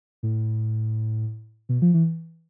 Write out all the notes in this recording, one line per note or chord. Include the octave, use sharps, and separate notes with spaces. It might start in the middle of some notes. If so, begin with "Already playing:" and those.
A2
B2
F3
E3